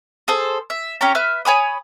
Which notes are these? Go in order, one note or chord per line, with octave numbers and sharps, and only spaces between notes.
G#4 A4 C5
E5
C#4 G4 C#5 A#5
B4 E5 E6 F6
C#5 G#5 B5 D#6